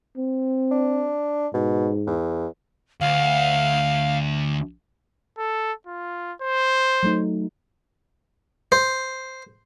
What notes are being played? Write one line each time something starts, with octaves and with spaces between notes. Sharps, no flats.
C4
D4
G#2 B2
E2
D2 F5
A4
F4
C5
F#3 A3 D#4
C5